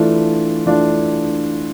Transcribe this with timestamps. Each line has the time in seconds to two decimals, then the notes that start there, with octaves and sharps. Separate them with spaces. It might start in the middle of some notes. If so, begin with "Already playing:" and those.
Already playing: E3 A3 D4 F4
0.66 E3 A3 D4 F4